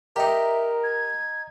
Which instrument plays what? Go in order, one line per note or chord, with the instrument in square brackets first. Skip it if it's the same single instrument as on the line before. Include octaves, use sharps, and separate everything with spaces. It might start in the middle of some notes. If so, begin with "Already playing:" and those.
[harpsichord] D#4 G4 [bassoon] A#4 [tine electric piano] D#5 A#5 [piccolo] E5
[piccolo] G#6